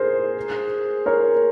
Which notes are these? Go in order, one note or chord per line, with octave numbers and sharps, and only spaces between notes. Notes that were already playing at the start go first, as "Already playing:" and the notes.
Already playing: G#4 A#4 C5
A#4 C#5